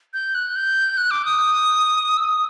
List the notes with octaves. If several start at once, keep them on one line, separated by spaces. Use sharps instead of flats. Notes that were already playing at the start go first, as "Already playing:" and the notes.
G6
F#6
G6
F#6
D6
D#6
E6
D#6